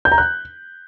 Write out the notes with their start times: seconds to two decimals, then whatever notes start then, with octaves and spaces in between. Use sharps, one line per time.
0.05 G6
0.12 A#5
0.18 F#6